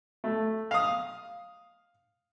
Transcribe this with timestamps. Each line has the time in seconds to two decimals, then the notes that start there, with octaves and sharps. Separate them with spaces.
0.24 A3
0.71 F5 D#6